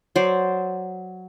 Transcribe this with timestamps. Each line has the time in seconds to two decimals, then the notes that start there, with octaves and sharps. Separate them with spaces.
0.15 F#3 C5 D5